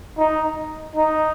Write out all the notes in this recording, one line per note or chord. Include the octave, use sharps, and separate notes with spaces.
D#4
D#4